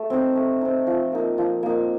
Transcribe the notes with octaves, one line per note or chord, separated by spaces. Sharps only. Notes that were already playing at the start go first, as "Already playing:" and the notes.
Already playing: A3
C4 D#4
A3
C4 D#4
F3
A#3 D#4
F3
A#3 D#4